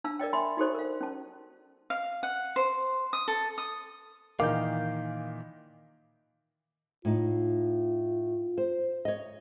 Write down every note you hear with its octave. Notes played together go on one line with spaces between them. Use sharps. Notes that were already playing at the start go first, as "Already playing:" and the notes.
D4 F5 A5 E6
A#4 D5 D#5 G5
D#5 E5 G#5 B5 C6
D#4 F#4 G4 A4 C5 D5
A#4 F5
C#4 A5
F5
F#5
C5
D#6
A4
D#6
A#2 D#3 E3 D#4 A#4 F5 D6 G6
A2 D#4 F4
C5
C#5 D#5